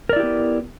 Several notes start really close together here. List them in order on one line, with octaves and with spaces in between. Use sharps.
A#4 D5 E4 G4 B3